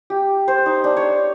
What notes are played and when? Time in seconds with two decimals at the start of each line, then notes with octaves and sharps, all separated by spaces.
0.10 G4
0.48 C5
0.66 D#4
0.84 D4
0.97 C#5